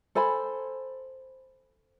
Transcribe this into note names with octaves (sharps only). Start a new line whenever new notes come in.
A4 C5 G#5 B5